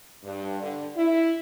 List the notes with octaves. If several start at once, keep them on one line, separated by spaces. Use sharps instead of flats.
G2
D3
E4